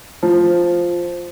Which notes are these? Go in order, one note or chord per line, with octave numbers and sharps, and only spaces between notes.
F3